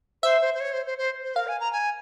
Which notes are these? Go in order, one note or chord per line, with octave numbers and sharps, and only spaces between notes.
C5 E5
C5
C5
C#5
C5
C5
C5
C5
A#4 F5
G#5
A#5
G#5